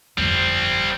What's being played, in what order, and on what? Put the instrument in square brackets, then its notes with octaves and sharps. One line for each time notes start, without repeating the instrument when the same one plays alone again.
[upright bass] G1 F2 [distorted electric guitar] G3 C4